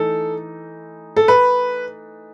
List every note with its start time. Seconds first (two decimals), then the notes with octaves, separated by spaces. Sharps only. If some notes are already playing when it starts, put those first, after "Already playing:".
Already playing: E3 A3 D#4 A4
1.17 A4
1.28 B4